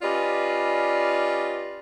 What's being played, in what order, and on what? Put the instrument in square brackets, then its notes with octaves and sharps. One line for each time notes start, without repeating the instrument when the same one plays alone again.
[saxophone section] C#4 F4 G4 B4 D5 D#5